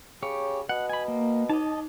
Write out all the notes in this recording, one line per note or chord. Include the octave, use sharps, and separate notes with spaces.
C#3 G4 C#5
B2 F#5
G#5 B5
A#3
D#4 D#5 A5